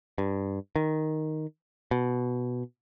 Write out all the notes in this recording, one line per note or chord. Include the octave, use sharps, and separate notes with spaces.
G2
D#3
B2